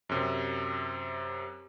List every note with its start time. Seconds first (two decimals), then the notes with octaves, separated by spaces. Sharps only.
0.09 F#2 C3